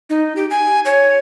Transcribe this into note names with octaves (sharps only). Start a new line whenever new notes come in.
D#4
G4
G#5
C#5